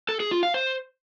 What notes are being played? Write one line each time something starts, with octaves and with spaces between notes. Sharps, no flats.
A4
G#4
F4
F5
C5